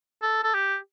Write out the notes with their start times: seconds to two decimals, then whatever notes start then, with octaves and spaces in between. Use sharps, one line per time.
0.22 A4
0.44 A4
0.54 G4